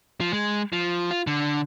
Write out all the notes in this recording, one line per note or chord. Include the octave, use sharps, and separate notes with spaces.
F3
G#3
F3
F4
D3